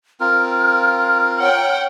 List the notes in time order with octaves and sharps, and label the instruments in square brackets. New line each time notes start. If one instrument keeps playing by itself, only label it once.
[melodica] C4 F4 A#4 [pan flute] F6
[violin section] C#5 F#5 G5